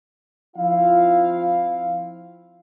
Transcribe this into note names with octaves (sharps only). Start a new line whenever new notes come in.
F3 C4 E4 F4 F5